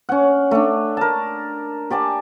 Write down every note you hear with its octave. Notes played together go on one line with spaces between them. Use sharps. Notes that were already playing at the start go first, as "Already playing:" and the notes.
C#4 F#5
A3 D4
A#4 A5
G4 D5 G#5 A5